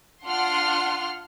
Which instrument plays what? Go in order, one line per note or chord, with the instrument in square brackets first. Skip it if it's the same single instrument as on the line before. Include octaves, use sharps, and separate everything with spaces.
[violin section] D4 F4 F#5 C6 F6